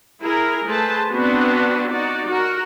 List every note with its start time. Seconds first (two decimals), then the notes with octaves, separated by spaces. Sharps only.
0.21 E4 G#4 A#4
0.67 A3 G#4 B4 C5 A5
1.11 B3 C4 D4 F#4 B4
1.91 D#4 F#4 D5
2.28 F#4 A#4